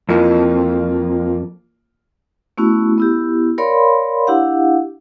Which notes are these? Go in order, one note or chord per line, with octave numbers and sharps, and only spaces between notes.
F2 E3 A#3 F4
A3 B3 C#4 E4 F#4
B3 E4 G4
A#4 C#5 D5 F5 B5 C6
D4 E4 G4 F5 F#5